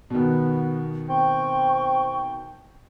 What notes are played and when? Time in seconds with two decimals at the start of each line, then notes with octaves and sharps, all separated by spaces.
0.10 B2 D#3 B3
1.09 C4 G5 C#6